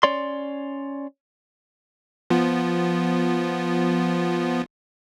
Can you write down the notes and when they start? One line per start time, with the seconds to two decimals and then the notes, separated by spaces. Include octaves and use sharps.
0.03 C#4 C#5 D5 C6
2.30 F3 B3 F4